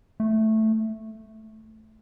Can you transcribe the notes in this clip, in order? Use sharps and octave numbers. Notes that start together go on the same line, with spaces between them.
A3